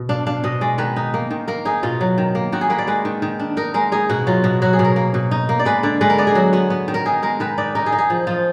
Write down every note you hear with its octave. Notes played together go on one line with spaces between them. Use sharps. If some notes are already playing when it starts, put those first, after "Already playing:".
Already playing: B2
D4 F5
D4 F5
B2 D#5
G#3 D5
D#3 B4
D#4
A#3
D#3
A#3 A#4
D#4 G#4
B2 F4
F#3
D#3
A#3
D#3 F#4
G#4
A#3 B4
D5
G#3 B4
D#3
D#3
D4
D#4 A#4
G#3 A#4
D#4 G#4
B2 F#4
F#3 F4
B2 F#4
F#3 F#4
G#4
B2
A#4
A#3
B2
D#4
A#3
D5
G#3 B4
D3 D5
G#3 B4
A#4
B3 D5
G#4
F#3 F#4
B3 F#4
B3
D#3
A#4
D#4 G#4
G#3 A#4
D#3 B4
D#4 D5
D#4 A#4
G#4
D#4
G#4
F3
F3 F4